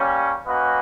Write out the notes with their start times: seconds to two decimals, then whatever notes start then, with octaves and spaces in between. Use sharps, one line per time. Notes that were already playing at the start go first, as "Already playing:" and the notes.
Already playing: G3 A#3 C#4
0.46 A#3 C#4 F#4 B4 D#5